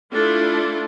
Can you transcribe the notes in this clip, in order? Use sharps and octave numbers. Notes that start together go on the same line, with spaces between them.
A3 D4 E4 F4 A4